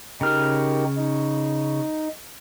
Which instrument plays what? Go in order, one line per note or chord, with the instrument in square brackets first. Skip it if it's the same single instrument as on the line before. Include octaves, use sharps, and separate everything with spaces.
[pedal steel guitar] C#3 F6 [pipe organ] D#4 G4 A#4
[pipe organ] D#4